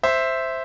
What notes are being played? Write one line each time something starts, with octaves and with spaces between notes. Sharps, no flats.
C5 E5